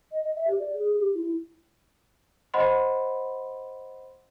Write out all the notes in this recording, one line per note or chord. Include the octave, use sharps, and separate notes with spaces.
D#5
D#5
E5
G4
D5
G#4
G4
E4
C5 D#5 F#5 B5 C6